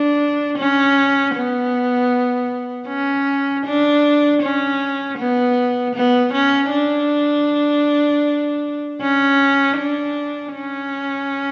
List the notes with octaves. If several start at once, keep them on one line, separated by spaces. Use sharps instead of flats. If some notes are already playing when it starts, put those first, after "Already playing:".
Already playing: D4
C#4
B3
C#4
D4
C#4
B3
B3
C#4
D4
C#4
D4
C#4